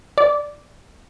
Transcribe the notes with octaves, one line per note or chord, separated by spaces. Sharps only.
D5